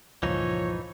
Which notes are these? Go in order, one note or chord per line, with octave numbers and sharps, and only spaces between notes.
C#2 G2 A#2 E3 F3 D#4 C#5